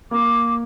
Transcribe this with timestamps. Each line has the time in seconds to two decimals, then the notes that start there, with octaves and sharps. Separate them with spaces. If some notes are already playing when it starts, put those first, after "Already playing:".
0.11 A#3 D6